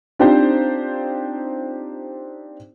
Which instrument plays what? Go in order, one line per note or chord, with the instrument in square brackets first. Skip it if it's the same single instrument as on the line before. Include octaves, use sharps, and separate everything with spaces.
[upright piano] C4 D4 D#4 F4 G4 C5